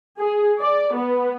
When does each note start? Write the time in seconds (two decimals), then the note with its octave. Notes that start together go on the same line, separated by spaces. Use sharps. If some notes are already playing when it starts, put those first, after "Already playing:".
0.19 G#4
0.61 D5
0.95 B3